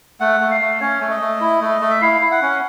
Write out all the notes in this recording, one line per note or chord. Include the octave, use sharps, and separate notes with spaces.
A3 F#5
A3
F5
A3
C#4 C#5
A3
D#5
A3
E4
A3
A3
E5
E4 F5
E4
F#5
C#4